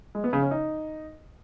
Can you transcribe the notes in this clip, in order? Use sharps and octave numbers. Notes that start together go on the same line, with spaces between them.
G#3
B3
C#3
C#4
D#4